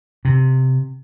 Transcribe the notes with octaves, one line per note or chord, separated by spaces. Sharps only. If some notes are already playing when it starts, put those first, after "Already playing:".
C3